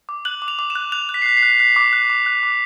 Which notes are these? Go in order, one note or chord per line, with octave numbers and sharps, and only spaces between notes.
D6
F#6 F#7
D6
F7
D6
E7
F#6
F#6 F7
F#6
B6
C7
F#6 B6
C7
F#6
F#6 B6
D6
F#6
D6
F#6
D6